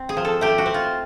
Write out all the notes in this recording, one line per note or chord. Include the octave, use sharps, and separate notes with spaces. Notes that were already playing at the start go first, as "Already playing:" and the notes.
Already playing: C4
G#4
F3
A4
A3 G4
F#4
C4
F4